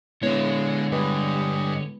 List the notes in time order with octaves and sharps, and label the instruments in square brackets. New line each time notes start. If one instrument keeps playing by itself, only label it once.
[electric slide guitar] D3 C#5 [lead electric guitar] G#3 [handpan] B3 E4
[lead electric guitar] G2 [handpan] G#3 B4 [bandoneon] G4 D#5 G#5